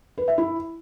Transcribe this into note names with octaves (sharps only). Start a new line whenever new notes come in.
B4
E5
E4